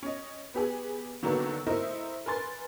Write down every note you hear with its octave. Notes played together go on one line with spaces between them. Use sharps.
C#4 D#5
B3 G4 G#4
D3 D#3 F#3 A#3 B3 D4
A3 C4 E4 A#4 C5 D#5
A#4 B4 G#5 C6 A6